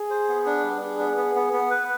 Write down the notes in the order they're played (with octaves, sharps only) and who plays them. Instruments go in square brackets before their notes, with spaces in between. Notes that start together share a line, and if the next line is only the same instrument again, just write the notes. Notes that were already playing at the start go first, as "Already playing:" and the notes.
Already playing: [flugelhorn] G#4
[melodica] C5
B3
D4
G3
[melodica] D4 [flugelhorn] G#4
[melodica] B3
B3
B3
B3
B4